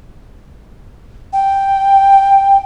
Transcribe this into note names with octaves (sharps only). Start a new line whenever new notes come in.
G5